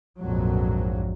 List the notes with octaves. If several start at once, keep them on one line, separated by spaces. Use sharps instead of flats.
A#1 F2 G#2 F#3